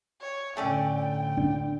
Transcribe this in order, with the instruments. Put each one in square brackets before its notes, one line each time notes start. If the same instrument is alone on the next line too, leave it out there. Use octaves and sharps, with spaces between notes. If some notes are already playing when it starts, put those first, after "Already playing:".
[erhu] C#5
[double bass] A2 D3 [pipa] A3 C#4 D5 [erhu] G5
[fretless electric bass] D4